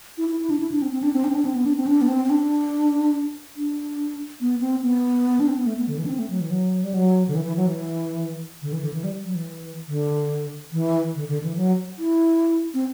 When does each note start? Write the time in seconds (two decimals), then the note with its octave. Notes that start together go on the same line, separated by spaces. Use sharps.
0.18 E4
0.29 E4
0.40 E4
0.50 D4
0.60 E4
0.71 D4
0.82 C4
0.92 C4
1.03 D4
1.13 C4
1.24 D4
1.29 C4
1.35 D4
1.45 C4
1.55 B3
1.66 D4
1.77 C4
1.87 D4
2.01 B3
2.08 C4
2.25 C4
2.30 D4
3.56 D4
4.41 B3
4.61 C4
4.82 B3
5.40 D4
5.48 C4
5.57 B3
5.66 A3
5.77 B3
5.88 D3
5.98 E3
6.05 D4
6.09 C4
6.19 A3
6.30 F#3
6.40 E3
6.51 F#3
6.83 G3
6.94 F#3
7.28 D3
7.35 E3
7.45 E3
7.57 F#3
7.67 E3
8.62 D3
8.73 E3
8.83 D3
8.94 E3
9.04 G3
9.25 F#3
9.35 E3
9.88 D3
10.72 E3
11.15 D3
11.28 D3
11.43 E3
11.57 F#3
11.99 E4
12.74 C4